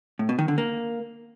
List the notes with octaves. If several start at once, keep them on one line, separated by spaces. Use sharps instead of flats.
A2
B2
D#3
D3
A#3